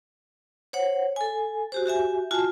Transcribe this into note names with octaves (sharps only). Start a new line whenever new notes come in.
C5 C#5 F#5
A4 G#5
F#4 G4 C5
F#4 G4 E5 G#5
F4 F#4 G#5 A5